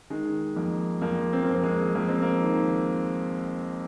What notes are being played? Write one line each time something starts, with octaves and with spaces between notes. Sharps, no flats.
D#3 G#3
F2 A#3
F2 A#3
C4
A#3
F2 C4
G#3
F2 A#3
C4
A#3
D#3